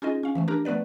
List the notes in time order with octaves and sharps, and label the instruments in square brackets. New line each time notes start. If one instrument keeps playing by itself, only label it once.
[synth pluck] C#4 D#4 F4 G#4 D#5
C#4 F5
E3 F3 A3
D4 G4 A#4 A#5
F3 A3 B3 B4 D5